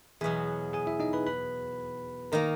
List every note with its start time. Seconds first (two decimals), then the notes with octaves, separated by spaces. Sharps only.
0.21 E2 B2 F#3 G#4 G#5
0.73 G#4 G#5
0.87 E4 E5
1.00 D#4 D#5
1.13 B4 B5
1.27 B4 B5
2.32 D#3 A#3 A#4 A#5